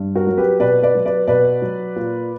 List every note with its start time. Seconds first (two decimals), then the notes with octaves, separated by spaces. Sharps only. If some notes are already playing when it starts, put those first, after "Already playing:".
Already playing: G2
0.15 F#4 A#4
0.27 F#3
0.37 G4 B4
0.60 B2 B4 D5
0.83 B4 D5
0.95 F#3
1.06 B4 D5
1.27 B2 B4 D5
1.62 F#3
1.96 A#2